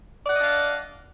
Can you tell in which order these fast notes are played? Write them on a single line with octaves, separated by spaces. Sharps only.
D5 F#5 D#5 D4 F5